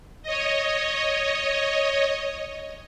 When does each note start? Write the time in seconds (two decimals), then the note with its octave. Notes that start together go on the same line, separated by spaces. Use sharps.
0.23 C#5 D#5